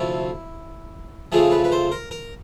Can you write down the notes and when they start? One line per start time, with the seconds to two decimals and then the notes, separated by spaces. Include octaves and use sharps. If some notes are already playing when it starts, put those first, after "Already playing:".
Already playing: D2 C3 F3 A3 E4
1.32 F2 C#3 F3 A3 G#4
1.52 B4
1.64 B4
1.72 C5
1.92 A#4
2.11 A#4